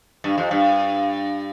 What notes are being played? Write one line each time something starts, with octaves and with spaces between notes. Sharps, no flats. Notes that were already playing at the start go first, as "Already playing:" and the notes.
G2
F2
G2